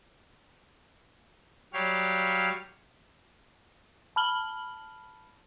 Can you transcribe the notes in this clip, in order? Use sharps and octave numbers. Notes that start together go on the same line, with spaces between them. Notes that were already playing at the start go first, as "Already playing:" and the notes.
F#3 G3 G4 C#5 F5 F6
A5 B5 F6 F#7 G7